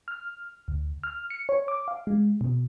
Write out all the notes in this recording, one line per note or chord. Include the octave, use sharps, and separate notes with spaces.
F6
D2
F6
C#7
C#5
D6
F5
G#3
B2